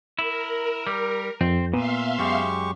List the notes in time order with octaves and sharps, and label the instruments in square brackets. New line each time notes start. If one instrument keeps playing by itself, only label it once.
[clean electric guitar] E4 [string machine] A#4
[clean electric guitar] G3
[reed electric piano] F2 [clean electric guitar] C4
[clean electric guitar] A#2 [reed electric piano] B3 [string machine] E5 F5 C6
[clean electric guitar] F#2 [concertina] G#3 G4 C#6